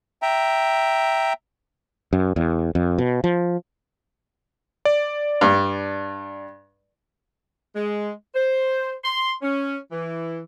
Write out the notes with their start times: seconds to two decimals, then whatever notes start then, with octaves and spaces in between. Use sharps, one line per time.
0.22 E5 G5 A#5
2.13 F#2
2.36 E2
2.75 F2
2.98 B2
3.24 F3
4.85 D5
5.41 G2
7.75 G#3
8.35 C5
9.04 C6
9.42 C#4
9.92 E3